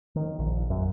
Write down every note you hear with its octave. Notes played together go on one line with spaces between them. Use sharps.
D#3
A#1
F#2